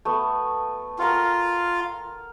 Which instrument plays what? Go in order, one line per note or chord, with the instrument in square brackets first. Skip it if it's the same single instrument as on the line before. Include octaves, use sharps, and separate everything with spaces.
[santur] A3 B3
[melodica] F4 [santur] A#4 F#5 G5